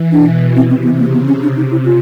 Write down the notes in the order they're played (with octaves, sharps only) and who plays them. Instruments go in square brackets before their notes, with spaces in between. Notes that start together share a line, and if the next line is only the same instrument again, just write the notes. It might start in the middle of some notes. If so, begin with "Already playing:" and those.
Already playing: [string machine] E3
[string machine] B2 [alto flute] D4
[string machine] C3 [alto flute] C4
[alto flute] C4
B3
[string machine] C#3 [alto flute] A#3
[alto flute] B3
C#4
[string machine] C3 [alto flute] D4
[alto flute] D#4
E4
F4